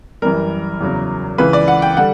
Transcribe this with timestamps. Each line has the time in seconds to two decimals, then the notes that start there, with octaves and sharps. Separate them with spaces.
0.22 F#2 E3 G3 A#4
0.81 E2 C#3 F#3
1.38 C#2 C#3 E3 B4
1.53 D5
1.68 F#5
1.82 G5
1.97 D3 G3 F#5